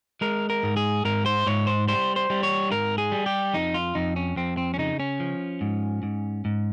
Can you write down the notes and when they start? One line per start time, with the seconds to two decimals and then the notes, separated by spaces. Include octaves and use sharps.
0.21 G#3 A#4
0.50 A#4
0.63 G#2
0.77 G#4
1.05 G#2 A#4
1.26 C5
1.46 G#2 C#5
1.67 C5
1.88 G3 C5
2.16 C5
2.30 G3
2.43 C#5
2.71 G#2 A#4
2.98 G#4
3.12 G3
3.26 G4
3.54 F2 D#4
3.74 F4
3.95 F2 D#4
4.16 C#4
4.36 F2 C4
4.57 C4
4.74 C#4
4.78 C#3 D#4
5.00 C#4
5.20 F3
5.61 G#2
6.03 G#2
6.45 G#2